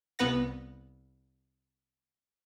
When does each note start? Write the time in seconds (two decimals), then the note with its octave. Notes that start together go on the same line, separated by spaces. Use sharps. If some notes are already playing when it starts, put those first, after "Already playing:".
0.19 C2 B3 B4 F#5 A#6